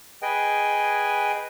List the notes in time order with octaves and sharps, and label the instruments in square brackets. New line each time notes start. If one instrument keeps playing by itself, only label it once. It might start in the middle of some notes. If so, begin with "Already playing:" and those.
[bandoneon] G#4 B4 D#5 G5 G#5